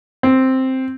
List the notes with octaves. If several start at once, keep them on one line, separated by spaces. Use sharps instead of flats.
C4